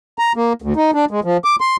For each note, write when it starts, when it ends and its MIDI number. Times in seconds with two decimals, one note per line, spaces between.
0.19 0.33 82
0.36 0.53 58
0.62 0.73 38
0.76 0.91 63
0.94 1.05 62
1.11 1.20 56
1.24 1.37 53
1.44 1.56 86
1.61 1.76 84